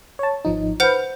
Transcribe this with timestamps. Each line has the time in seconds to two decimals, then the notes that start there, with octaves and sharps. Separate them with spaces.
0.19 C#5 A5
0.45 G#1 F3 D#4
0.80 B4 C5 F#5 F6 G6